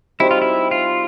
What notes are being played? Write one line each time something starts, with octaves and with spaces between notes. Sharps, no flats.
G3 C4 D#4 E4 F#4
F4
E4
F4